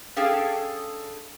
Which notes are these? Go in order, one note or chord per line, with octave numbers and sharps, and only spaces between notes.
C#4 D4 G#4 A4 F5 G5